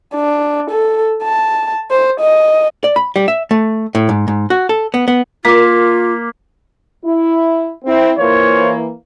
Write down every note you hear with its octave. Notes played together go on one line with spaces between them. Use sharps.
D4
A4
A5
C5
D#5
D5
B5
G3
E5
A3
A2
G#2
G#2
F#4
A4
B3
B3
A#3 F4 D6 B6
E4
C4 E4
E3 A#3 F4 C5 C#5